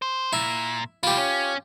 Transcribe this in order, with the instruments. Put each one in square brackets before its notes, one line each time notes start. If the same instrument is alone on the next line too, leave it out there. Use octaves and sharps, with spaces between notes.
[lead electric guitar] C5
[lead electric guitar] A#2 [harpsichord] E4
[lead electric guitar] E3 G3 [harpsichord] F4 G4
[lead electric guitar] C#4